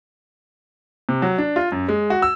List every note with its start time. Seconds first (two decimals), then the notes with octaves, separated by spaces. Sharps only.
1.09 C3
1.22 F#3
1.38 D4
1.56 F4
1.72 F#2
1.89 G#3
2.10 F#4
2.22 E6